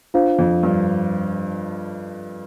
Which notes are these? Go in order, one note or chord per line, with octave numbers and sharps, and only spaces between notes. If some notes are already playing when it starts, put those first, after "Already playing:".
D4 F4 C5 F5
F2
G2